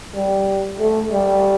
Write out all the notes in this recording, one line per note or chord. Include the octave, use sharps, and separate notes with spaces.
G3
A3
G3